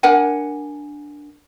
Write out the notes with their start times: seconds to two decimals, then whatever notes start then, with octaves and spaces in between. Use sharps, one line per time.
0.03 D4 A#4 F#5 G#5